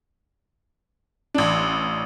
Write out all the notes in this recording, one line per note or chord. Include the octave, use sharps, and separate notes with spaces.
A1 D4